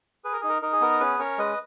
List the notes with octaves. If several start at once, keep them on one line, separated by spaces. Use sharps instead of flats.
G#4 B4
A#4
D#4 G#4
A#4
D#4 A#4
G#4
B3 A#4
C#4 G#4 B4
C#4 A#4 C#5
G#3 B4 D#5